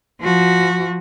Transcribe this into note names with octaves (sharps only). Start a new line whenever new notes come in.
F3 F#4